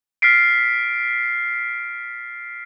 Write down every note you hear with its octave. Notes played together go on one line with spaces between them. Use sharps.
F6 A6 B6 C7 D7